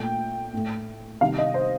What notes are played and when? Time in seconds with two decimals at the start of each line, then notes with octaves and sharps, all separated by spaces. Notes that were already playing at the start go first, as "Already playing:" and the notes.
Already playing: A#2 A3 G5
0.53 A2 A3
1.21 C3 D#3 G3 F5
1.38 D#5
1.54 C5